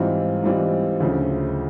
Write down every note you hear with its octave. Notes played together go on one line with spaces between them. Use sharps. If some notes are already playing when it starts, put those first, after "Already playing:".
Already playing: G#2 E3 G3 C4 F4
G#2 E3 G3 C4 F4
D2 C#3 F3